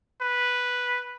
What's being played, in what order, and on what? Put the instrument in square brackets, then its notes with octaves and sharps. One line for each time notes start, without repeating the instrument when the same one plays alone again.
[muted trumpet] B4